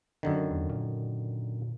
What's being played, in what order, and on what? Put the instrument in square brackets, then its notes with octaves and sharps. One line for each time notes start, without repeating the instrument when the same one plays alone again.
[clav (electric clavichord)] F#2 D3 D#3
[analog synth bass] E2
A#2